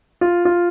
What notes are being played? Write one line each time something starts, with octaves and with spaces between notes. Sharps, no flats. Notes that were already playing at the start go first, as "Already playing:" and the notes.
F4
F4